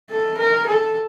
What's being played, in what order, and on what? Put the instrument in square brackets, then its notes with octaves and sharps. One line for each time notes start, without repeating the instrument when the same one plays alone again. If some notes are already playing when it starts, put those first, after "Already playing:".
[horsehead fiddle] A4
A#4
A4